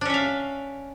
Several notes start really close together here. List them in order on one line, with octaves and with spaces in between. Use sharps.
D4 C#4 E5 F5